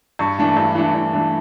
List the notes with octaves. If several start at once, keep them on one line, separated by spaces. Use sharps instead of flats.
G2 C#6
E3 A3 D4
G2
E3 A3 D4
G2
E3 A3 D4